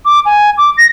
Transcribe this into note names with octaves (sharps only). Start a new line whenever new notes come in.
D6
G#5
D6
A#6